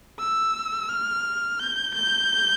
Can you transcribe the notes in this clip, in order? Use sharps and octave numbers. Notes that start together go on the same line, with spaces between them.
E6
F6
G6
G6